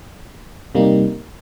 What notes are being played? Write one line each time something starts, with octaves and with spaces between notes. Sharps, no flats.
C3 G3 A#3 D#4